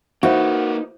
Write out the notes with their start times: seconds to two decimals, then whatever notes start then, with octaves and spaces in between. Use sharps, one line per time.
0.23 A#3 D#4 F#4 B4 C5 E5 F5